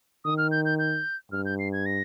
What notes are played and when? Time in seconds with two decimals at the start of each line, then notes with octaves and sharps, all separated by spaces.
0.25 D#3 D#6
0.38 F6
0.51 G6
0.65 G6
0.79 G6
1.32 G2 F6
1.45 G6
1.59 C7
1.73 G#6
1.86 A#6